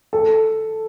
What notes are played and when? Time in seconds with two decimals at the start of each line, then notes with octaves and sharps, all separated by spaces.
0.13 A4